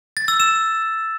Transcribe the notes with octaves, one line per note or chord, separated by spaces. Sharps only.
A6
E6
E7